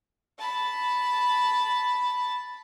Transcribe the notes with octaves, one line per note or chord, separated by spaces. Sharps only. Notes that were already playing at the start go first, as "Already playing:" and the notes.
A5 B5